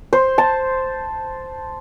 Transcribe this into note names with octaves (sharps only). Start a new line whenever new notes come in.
C5
A5